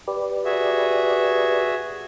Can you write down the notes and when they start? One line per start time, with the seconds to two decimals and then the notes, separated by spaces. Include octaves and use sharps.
0.08 G4 B4 D5
0.45 F#4 G#4 E5